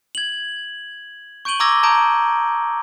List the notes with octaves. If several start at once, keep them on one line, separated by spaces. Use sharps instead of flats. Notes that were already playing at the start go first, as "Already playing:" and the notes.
G#6 F#7
C#6 G6 D7 D#7 F#7 G7
A#5 C#6 D6 E6 G#6 A#6
A5 A#5 D#6 G6 D7